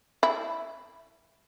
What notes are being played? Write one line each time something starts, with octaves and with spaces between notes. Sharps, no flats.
E4